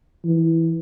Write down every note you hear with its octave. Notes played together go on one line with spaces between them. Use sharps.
E3